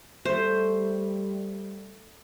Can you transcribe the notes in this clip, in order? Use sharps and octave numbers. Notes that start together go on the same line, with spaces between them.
G3 A3 C5